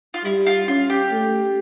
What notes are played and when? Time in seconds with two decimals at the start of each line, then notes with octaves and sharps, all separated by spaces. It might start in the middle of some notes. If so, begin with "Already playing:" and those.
0.14 F4
0.24 G3 E4
0.46 F4
0.68 C#4 F4
0.90 G4
1.11 A3